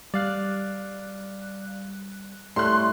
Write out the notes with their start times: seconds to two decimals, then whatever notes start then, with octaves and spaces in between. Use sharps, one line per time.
0.14 G3 D5 F5 F#6
2.56 A2 G3 A3 C6 F#6